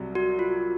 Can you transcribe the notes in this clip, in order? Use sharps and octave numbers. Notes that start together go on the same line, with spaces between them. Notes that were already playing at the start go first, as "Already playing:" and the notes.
Already playing: C2 C3 F#3 C4
F#4
F4